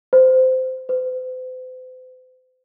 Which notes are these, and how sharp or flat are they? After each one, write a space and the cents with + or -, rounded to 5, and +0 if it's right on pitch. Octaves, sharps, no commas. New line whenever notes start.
C5 -20
C5 -45